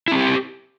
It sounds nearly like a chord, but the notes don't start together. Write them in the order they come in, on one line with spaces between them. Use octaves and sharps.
E4 C4 G4